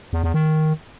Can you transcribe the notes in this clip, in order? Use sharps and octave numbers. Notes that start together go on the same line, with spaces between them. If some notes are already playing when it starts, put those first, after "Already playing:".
E2
E2
D#3